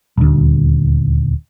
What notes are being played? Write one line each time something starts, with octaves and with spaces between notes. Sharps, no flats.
D#1 D2